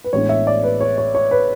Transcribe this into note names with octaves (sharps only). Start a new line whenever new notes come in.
B4
A1 A2 G#3 B3 D4 C#5
E5
D5
B4
C#5
C#5
C#5
B4